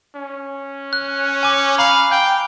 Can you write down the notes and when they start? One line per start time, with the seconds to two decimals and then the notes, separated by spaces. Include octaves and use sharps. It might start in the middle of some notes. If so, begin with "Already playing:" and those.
0.16 C#4
0.93 F#6
1.43 G#5 D6
1.78 F5 A#5 B5
2.11 G5 G6